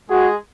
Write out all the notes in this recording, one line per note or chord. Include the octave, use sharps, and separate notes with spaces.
G#3 F#4 G#4